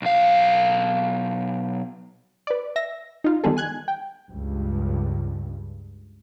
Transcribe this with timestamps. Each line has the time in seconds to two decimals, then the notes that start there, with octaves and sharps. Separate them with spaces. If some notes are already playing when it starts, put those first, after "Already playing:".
0.02 B1 F5
2.47 B4 D5
2.76 E5 A#6
3.24 D#4 F4
3.44 D#3 G3 G#3 B3 G#4 A4
3.57 G#5 F#6 G#6
3.88 G5
4.29 C#2 G2